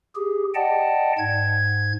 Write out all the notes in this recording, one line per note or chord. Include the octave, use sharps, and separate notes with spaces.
G4 G#4
D5 D#5 F#5 G5 A5
G#2 G#6